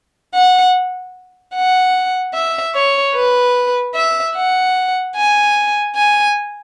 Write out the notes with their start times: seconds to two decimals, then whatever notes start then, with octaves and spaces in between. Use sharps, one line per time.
0.34 F#5
1.55 F#5
2.34 E5
2.75 C#5
3.15 B4
3.95 E5
4.36 F#5
5.16 G#5
5.96 G#5